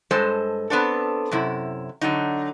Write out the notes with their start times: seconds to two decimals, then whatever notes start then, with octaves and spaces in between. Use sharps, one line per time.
0.11 G2 G#3 A4 C5 D#5
0.70 B3 C4 D4 A4
1.31 F#2 C3 E4
2.01 D3 F#3 D#4